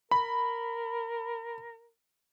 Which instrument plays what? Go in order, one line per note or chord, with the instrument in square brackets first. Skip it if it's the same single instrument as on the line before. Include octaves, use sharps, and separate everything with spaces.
[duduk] A#4 [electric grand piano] B5